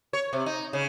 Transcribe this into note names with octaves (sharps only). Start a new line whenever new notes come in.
C#5
C3
D#4
C#3